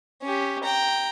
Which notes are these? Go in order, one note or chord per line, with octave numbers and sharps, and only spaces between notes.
C#4 G4
G5 A#5